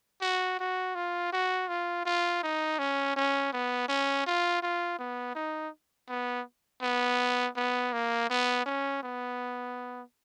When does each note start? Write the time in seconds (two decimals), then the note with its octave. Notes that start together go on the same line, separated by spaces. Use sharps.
0.22 F#4
0.59 F#4
0.95 F4
1.32 F#4
1.68 F4
2.05 F4
2.43 D#4
2.79 C#4
3.16 C#4
3.53 B3
3.88 C#4
4.26 F4
4.62 F4
4.99 B3
5.35 D#4
6.09 B3
6.82 B3
7.56 B3
7.93 A#3
8.30 B3
8.66 C#4
9.03 B3